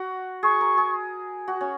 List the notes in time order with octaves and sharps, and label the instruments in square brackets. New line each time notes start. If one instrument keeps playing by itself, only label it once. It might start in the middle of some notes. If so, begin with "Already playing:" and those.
Already playing: [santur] F#4
[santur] G#4 [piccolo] C#6
[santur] A#4
G#4
F#4
C#4